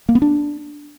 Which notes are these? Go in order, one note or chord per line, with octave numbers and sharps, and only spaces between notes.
A#3
B3
D4